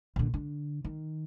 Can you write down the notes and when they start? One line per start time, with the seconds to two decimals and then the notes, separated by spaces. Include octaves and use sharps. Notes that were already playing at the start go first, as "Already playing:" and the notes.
0.16 A#2 D3
0.34 D3
0.85 D#3